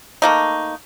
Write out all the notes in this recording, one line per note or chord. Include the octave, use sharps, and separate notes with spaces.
A3 A#3 D#4